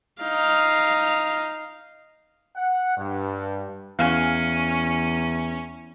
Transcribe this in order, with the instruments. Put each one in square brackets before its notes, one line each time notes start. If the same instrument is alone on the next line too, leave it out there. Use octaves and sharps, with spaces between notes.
[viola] D#4 F5
[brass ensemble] F#5
G2
[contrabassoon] E2 [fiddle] C#4 [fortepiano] F5 G#5